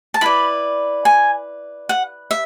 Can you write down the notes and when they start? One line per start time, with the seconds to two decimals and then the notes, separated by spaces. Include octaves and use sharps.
0.14 A5
0.21 E4 B4 D5 B5
1.05 G#5
1.89 F#5
2.31 E5